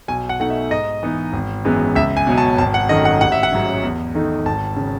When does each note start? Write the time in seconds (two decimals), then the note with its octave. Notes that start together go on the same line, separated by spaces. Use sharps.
0.08 B1 G#5
0.29 F#5
0.40 B2 A3 D#4 F#5
0.50 E5
0.71 G#2 D#5
1.03 E3 B3 D#4
1.33 G#1
1.65 F#2 E3 G#3 B3
1.96 C#2 E5
2.17 G#5
2.27 B2 F#3 C#4
2.38 A5
2.58 G#1 A5
2.74 F#5
2.89 F#2 D#3 A3 D#5
3.05 F#5
3.20 A1 F#5
3.32 E5
3.43 F#5
3.52 G#2 F#3 C#4
3.83 E2
4.14 D#3 A3 D#4
4.45 G#1 A5
4.77 C#3